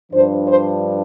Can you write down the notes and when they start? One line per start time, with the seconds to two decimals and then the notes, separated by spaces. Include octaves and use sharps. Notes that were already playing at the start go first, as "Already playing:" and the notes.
0.12 G2 F3 D4 C5
0.47 C5